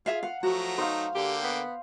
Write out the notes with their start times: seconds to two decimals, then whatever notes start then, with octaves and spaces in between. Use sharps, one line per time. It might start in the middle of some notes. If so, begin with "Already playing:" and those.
0.06 F4 G#4 E5 F5
0.23 F5 F#5
0.43 F3 F#3 A3 F#4 A#5
0.78 D#4 C5 F5
1.15 D3 A#3 G4 G5
1.43 B3